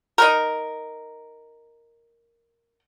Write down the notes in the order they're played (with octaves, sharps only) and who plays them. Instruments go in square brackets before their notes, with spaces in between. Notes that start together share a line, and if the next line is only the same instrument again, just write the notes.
[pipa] D#4 A#4